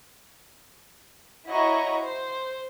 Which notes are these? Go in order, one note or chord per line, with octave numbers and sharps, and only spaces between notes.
E4 F#4 C#5 D#5 A#5 C#6
C5